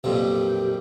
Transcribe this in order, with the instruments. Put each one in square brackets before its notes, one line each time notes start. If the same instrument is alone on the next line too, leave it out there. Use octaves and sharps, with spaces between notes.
[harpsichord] B1 F2 A#2 [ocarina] G4